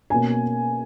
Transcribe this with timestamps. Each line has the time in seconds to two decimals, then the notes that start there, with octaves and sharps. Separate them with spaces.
0.10 B2 A#3 C#4 G#5